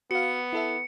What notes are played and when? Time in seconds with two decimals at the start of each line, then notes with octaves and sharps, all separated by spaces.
0.11 B3 F#4 F5 C#7
0.53 E4 A4 E5